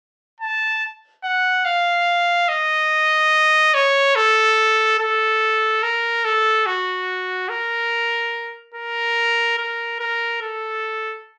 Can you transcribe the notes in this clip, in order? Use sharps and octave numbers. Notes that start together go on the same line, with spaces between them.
A5
F#5
F5
D#5
C#5
A4
A4
A#4
A4
F#4
A#4
A#4
A#4
A#4
A4